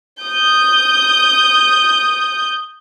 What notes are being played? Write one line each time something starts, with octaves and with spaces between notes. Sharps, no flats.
D#6 G6